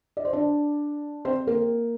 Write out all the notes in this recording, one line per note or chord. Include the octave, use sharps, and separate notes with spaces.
D5
C5
D4 D5
C4 C5
A#3 A#4